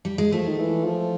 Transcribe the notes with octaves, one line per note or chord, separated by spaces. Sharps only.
G3
G#3
F3 A3
D#3
E3
F3